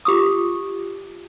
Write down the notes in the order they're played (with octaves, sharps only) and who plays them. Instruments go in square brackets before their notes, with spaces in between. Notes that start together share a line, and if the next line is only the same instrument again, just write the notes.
[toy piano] F4 G4 D6 D#6